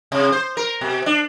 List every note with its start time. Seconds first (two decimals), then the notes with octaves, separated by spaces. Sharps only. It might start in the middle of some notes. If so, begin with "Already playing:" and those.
0.12 C3
0.32 C5
0.57 A#4
0.81 B2
1.06 D4